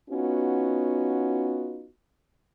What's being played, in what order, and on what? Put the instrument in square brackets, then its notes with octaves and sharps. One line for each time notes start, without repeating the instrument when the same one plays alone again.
[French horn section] B3 C#4 D#4 F4 F#4